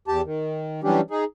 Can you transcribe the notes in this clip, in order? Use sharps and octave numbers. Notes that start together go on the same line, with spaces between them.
E2 G4 A5
D#3
E3 F#3 G3 C#4 D4 G4
D#4 G#4